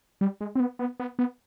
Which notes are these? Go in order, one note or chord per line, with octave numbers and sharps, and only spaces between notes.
G3
G#3
C4
B3
B3
B3
B3